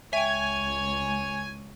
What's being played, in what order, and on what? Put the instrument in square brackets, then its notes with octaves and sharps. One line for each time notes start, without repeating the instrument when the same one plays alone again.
[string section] C#2 [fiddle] C#5 [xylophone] E5 G5 [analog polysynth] G#5